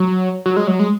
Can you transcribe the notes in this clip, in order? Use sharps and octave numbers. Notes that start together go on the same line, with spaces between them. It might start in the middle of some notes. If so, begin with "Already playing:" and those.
Already playing: F#3
F#3
G#3
F#3
G#3